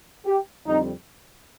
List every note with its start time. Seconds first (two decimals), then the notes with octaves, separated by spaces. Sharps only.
0.25 G4
0.65 F2 D3 G3 C4 D#4